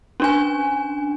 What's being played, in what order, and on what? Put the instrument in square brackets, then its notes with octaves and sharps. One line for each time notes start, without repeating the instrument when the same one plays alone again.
[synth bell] C#4 D4 G#5